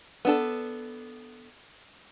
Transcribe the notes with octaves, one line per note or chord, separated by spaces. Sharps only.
B3 D4 A4